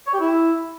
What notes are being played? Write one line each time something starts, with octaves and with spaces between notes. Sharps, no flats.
C#5
G4
E4